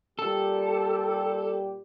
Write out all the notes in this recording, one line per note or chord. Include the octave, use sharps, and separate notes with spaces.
A#2 G3 G4 A4